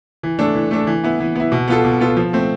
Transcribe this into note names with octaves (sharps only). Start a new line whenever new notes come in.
E3
A3 D4 A4
E3
A3 D4 A4
E3
B3 E4
E3
B3 E4
B2
B3 F4 A4
B2
B3 F4 A4
F3
A3 C4